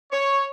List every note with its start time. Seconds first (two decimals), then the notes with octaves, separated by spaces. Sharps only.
0.11 C#5